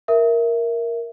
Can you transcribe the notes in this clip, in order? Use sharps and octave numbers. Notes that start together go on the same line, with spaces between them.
A#4 E5